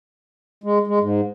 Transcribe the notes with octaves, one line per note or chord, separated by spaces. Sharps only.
G#3
G#3
G#2